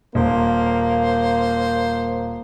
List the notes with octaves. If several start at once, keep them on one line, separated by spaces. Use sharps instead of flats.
D#1 A#3 C5